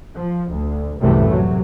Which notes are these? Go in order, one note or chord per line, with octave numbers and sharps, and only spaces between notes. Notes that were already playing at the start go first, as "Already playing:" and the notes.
F3
D2
C2 F#2 A2 C3 E3 A3
C3 F#3